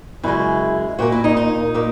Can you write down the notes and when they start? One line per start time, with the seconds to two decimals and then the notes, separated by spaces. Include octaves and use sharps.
0.24 F#2 C#3 G#3 E4
0.99 A#2 A#3 F#4
1.12 E4
1.24 D#4
1.37 D#4
1.74 A#2 A#3